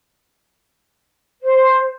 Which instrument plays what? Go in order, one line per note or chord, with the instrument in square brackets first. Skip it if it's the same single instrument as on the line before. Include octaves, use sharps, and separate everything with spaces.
[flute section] C5